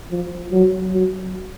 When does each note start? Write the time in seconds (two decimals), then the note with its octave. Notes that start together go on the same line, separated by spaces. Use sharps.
0.11 F3
0.52 F#3
0.92 F#3